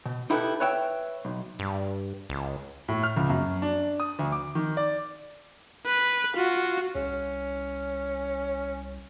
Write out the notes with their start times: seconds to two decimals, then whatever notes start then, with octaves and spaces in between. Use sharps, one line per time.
0.06 B2
0.30 D#4 E4 G4 A4 B4
0.60 B4 C#5 E5 G5
1.25 B1
1.59 G2
2.29 C#2
2.88 A2
3.03 F6
3.17 C#2
3.30 F#2
3.62 D4
4.00 D#6
4.19 D2
4.32 D6
4.55 D#3
4.77 D5
5.86 B4
6.34 F4 F#4
6.95 C2 C#4